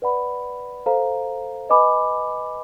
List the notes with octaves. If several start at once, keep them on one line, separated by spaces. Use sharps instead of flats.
B4 D5 F#5 B5
A4 C5 F5 A#5
B4 D#5 G#5 B5 D6